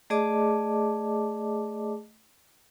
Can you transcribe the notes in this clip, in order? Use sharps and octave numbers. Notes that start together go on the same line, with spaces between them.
A3 G#4 D5 D#5 A5 D6